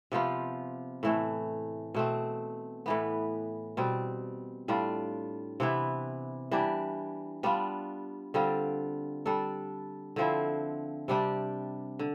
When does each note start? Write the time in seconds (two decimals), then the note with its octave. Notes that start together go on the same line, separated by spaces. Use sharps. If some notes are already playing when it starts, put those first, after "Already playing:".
0.12 C3 F3 B3 F4
1.03 A2 E3 A3
1.95 B2 A3 C4
2.86 A2 E3 B3
3.77 B2 G3 C4
4.68 A2 G3 D4 F4
5.60 C3 E3 B3 E4
6.51 E3 G3 D4 G4
7.43 G3 B3 D4 F4
8.34 D3 G3 C4 F4
9.26 G3 D4 A4
10.16 D3 F3 C4 E4
11.08 C3 G3 D4 G4
11.99 D3